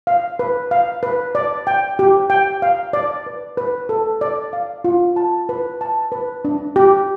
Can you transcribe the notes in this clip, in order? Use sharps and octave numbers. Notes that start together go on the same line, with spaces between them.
F5
B4
F5
B4
D5
G5
G4
G5
F5
D5
B4
B4
A4
D5
F5
F4
A5
B4
A5
B4
D4
G4